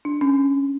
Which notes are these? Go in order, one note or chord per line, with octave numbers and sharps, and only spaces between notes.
D4
C#4